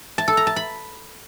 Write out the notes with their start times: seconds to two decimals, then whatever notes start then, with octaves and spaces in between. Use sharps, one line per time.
0.18 A5
0.28 A4
0.37 A#5
0.47 A5
0.56 B5